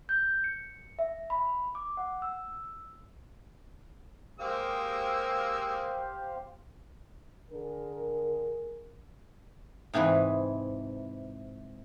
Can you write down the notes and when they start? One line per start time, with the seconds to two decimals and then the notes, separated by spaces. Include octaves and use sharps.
0.09 G6
0.44 C#7
0.99 E5
1.30 B5
1.75 D6
1.97 F#5
2.22 E6
4.40 G#3 A#3 G4 C5 F5 E6
7.51 D3 G#4 A#4
9.93 G#2 C3 E3 G#4 B4